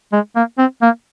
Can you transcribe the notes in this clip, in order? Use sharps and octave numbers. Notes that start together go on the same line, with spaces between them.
G#3
A#3
C4
A#3